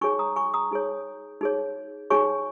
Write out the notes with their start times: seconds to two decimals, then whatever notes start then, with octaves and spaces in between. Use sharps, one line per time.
0.01 D#4 G#4 C#5 G#5 C#6
0.19 A#5 D#6
0.36 G#5 C#6
0.54 A#5 D#6
0.71 D#4 G#4 C#5
1.41 D#4 G#4 C#5
2.10 D#4 G#4 C#5 G#5 C#6